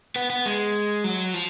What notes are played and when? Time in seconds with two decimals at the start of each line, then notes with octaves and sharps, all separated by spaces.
0.16 B3
0.30 B3
0.45 G#3
1.04 F#3
1.34 F3